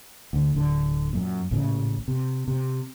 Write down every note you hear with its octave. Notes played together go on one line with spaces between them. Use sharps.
D2 D3
D1 D3
F#2 A#2
A1 A#2 C#3
C3
C3